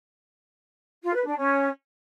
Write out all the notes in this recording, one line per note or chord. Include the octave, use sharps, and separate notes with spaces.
F4
B4
D4
C#4